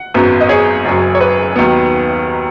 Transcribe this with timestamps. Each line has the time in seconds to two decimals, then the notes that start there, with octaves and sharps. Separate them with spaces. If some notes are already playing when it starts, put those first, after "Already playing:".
Already playing: F#5
0.14 G#1 F#2 F#3 B3
0.41 D#5
0.49 G#4 C#5
0.85 F#1 F#2 F#3
1.15 C#5
1.21 B4
1.56 D#2 D#3 F#3 B3